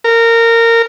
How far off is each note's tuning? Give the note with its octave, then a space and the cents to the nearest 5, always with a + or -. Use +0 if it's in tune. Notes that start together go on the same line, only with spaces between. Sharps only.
A#4 -20